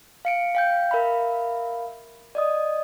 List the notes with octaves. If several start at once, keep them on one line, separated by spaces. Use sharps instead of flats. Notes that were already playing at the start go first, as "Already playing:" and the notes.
F5 C#7 D7
F5 G5 G6
A#4 E5 F5 B5
D5 D#5 D#6